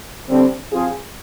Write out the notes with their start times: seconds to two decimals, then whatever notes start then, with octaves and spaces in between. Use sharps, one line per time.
0.28 D3 G3 C4
0.71 F3 C4 F4 G#4